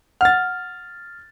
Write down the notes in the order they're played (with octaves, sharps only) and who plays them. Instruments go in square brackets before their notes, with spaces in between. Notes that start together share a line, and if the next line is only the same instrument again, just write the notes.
[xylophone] F#5 [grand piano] F6 A6